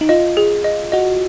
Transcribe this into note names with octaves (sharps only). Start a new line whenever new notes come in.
D#4
F4 D#5
G#4
D#5
F#4 D#5